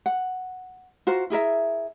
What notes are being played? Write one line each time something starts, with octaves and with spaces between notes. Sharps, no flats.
F#5
F4 F#4 A#4 C5
E4 G#4 A#4 E5